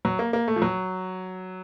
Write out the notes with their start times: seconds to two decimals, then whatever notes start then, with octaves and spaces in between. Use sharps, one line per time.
0.05 F#3
0.19 A#3
0.33 A#3
0.48 A3
0.56 F3
0.62 F#3